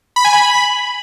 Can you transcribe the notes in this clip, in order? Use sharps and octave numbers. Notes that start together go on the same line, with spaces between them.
B5
G#5
B5